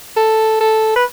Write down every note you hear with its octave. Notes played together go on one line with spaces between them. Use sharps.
A4
A4
B4